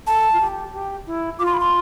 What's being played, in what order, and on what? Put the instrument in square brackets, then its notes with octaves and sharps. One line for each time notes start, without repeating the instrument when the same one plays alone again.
[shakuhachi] A4 [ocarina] A5
[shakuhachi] F4
G4
G4
E4
[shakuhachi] F4 [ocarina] D6
[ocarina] C6
B5
C6